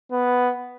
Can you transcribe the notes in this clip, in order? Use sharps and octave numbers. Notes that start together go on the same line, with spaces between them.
B3